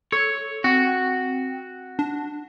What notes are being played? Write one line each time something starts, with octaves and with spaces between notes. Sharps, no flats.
A4 C#5
C4 F#4
D4